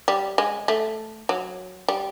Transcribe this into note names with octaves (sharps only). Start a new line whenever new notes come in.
G3
G#3
A3
F#3
G3